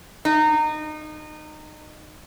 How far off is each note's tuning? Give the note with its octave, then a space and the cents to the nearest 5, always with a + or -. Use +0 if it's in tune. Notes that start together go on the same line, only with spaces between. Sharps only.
D#4 -25